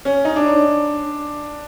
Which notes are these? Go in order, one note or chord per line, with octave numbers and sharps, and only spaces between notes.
C#4
D#4
D4